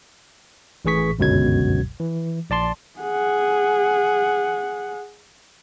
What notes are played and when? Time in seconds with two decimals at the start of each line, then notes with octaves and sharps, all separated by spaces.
0.85 A1 A2 E3 G#4 C#6 B6
1.19 G1 C#2 F#2 B2 F#3 G#6
2.00 E3
2.50 A#1 D5 A5 C6
3.00 G#4 F#5